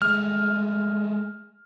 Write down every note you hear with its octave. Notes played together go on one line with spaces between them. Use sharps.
G#3 A3 F6